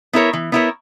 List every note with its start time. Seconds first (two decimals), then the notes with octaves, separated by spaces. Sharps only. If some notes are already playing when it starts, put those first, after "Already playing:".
0.13 B3 E4 A#4 C#5
0.33 E3
0.52 B3 E4 A#4 C#5